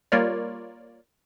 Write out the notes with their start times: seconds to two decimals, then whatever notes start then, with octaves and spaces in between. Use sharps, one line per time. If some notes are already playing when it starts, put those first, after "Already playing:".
0.12 G3 A#3 F4 A#4 C#5 D5